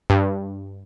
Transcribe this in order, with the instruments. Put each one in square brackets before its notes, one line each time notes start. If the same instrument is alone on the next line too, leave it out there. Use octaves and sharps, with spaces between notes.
[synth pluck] G2